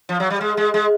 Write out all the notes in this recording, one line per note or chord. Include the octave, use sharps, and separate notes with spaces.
F3
F#3
G3
G#3
G#3
G#3